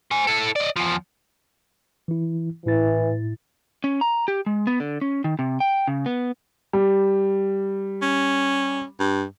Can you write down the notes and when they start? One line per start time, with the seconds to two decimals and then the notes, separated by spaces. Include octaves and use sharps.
0.11 C5 G#5
0.27 E4 A4
0.56 D5 D#5
0.76 E2 F3
2.08 E3 E4
2.66 A2 E3 E4 A6
3.84 C#4
4.01 A#5
4.28 G4
4.46 G#3
4.67 B3
4.80 D3
5.01 C#4
5.24 D#3
5.39 C3
5.60 G5
5.88 C#3
6.06 B3
6.73 G3
8.02 C#4
9.00 G2